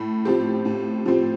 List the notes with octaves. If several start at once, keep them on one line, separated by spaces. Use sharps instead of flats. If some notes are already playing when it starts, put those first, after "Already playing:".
Already playing: A2
F3 C4 G4
A2
F3 C4 G4